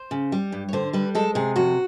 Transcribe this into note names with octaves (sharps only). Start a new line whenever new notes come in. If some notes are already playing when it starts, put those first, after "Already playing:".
Already playing: C5
C#3
G3
G2
C#5
D3 C5
G3 B4
G#3 A4
C3 G#4
F2 F#4